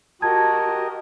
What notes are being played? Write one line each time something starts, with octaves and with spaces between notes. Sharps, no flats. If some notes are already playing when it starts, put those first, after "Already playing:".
F#4 G4 A#4 D#5 A5 G#6